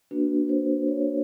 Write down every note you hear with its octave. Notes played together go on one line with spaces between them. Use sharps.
A#3 D4 F#4 B4
C5
C#5